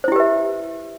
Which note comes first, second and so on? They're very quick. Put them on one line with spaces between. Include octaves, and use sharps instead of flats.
C5 E4 G4 B4 E5